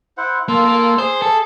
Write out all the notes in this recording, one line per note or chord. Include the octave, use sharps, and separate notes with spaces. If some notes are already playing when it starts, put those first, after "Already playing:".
E4 C5 F#5
A#3 F4 A4
A#3
G#4 C5
A4